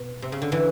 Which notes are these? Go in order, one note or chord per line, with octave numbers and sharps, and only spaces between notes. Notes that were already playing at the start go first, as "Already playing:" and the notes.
Already playing: B2
C3
C#3
D3
D3 E3